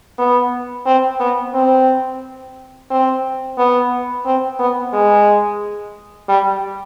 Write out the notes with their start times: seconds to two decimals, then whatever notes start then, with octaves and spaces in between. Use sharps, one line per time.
0.18 B3
0.86 C4
1.20 B3
1.54 C4
2.90 C4
3.58 B3
4.25 C4
4.59 B3
4.93 G#3
6.29 G3